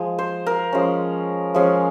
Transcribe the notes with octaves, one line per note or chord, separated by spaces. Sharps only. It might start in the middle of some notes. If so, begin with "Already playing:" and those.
Already playing: F3 G#3
C5
A#4
F3 G#3 C#4
F3 G#3 C#4